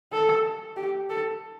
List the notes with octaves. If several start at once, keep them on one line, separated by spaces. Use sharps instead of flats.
A4
G4
A4